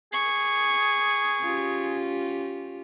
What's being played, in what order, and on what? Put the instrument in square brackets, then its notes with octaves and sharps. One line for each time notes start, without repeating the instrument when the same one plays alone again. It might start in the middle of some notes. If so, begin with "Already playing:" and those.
[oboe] G#4 [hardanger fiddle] C#6
[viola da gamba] C#4 F4 G4